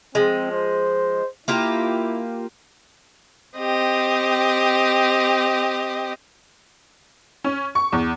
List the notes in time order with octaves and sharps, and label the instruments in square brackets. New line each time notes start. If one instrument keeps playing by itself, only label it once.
[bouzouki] F3 G#3 [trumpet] C4
[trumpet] C5
[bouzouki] A#3 F4 G4 [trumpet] E4
[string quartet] C4 G4 D#5
[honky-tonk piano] C#4
C#6
E2